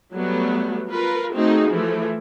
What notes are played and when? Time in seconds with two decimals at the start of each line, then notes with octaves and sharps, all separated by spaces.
0.14 F#3 G3 A3 B3
0.90 F4 A#4 B4
1.35 A3 C4 D#4 F#4 G#4
1.69 E3 F3 A3